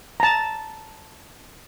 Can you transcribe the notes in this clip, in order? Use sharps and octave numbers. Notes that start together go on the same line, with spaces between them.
A5 A#5